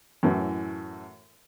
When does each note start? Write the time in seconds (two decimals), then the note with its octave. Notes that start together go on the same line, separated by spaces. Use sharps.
0.23 F#2 A2 E3